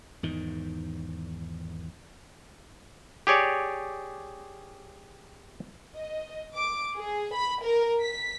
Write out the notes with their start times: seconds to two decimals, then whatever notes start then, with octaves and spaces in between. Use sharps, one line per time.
0.23 E2 G#2 D#3
3.27 G4 G#4 C#5 D5
5.95 D#5
6.54 D6
6.96 G#4
7.34 B5
7.62 A#4
8.00 B6